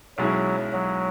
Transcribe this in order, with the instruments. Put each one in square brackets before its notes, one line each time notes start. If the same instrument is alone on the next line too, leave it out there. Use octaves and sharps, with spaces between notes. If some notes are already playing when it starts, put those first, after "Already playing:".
[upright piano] B1 B2 G#3 C#4 E4 [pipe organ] F#3
[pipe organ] F#3